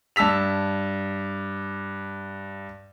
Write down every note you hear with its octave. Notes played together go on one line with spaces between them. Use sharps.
G2 A5 E6 B6 F7